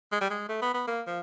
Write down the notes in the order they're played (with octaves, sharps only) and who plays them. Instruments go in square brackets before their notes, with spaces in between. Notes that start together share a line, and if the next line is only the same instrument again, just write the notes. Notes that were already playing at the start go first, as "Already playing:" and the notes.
[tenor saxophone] G#3
G3
G#3
A3
B3
B3
A#3
F3